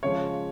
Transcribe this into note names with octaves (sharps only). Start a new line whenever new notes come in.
C#3 F3 G#3 C#5